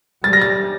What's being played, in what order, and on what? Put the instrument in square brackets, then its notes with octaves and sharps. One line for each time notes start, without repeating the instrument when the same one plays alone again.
[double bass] G3 [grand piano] A6
[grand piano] A#6
A6